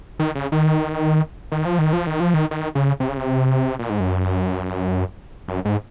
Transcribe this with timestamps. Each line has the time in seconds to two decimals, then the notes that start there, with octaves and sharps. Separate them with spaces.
0.19 D#3
0.35 C#3
0.52 D#3
1.52 D#3
1.65 F3
1.79 D#3
1.93 F3
2.07 D#3
2.20 F3
2.34 D#3
2.51 D#3
2.75 C#3
3.00 C3
3.09 C#3
3.17 C3
3.79 A#2
3.90 G#2
4.00 F#2
5.48 F#2
5.65 G#2